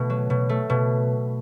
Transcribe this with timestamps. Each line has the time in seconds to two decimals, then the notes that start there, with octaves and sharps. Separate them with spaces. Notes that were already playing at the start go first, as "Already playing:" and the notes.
Already playing: B2 A3
0.10 F#3
0.30 B2
0.49 A3
0.70 B2